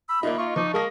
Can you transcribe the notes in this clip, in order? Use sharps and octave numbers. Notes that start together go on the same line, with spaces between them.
B5 E6
A#2 A#3 D#4 E5
F4 C#6
F3 D#4 D6
G#3 A#3 A5 D#6 A#6